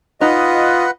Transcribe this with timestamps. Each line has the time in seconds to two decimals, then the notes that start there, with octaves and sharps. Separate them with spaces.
0.21 D#4 F4 B4 D#5 F#5